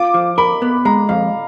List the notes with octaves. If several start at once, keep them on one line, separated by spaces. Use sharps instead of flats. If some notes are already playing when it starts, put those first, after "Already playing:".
Already playing: F4 D6
F3
A#4 B5
B3
G#3 A#5
F2 F5